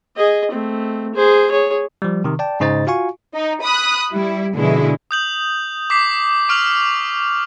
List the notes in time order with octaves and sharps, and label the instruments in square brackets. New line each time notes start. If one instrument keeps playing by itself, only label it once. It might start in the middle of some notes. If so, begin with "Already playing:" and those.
[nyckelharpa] G#4 D#5
A3 C4
G#4 C5
G#4 C#5
[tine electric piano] F3 G3
C3 D#3
D5 G5 A5
G#2 C#3 D#4 C5 D#5 A6
F4 F#4 F5 G#5 C#6
[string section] D#4
B5 D#6 F#6
G3 E4
B2 D3 F3 G#3 E4
[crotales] D#6 G6 F#7
D6 B6 C7
C#6 F6 F7 F#7